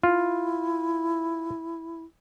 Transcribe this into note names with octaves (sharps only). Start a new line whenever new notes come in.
E4 F4